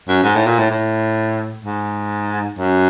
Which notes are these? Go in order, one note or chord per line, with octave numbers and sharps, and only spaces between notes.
F#2
G#2
A2
A#2
A2
A2
G#2
F#2